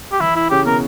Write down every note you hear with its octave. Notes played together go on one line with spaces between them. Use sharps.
G4
E3 E4
E4
C#3 G4
B2 A#4